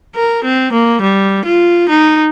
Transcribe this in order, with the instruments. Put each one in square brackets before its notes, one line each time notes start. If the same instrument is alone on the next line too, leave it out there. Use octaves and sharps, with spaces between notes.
[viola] A#4
C4
A#3
G3
F4
D#4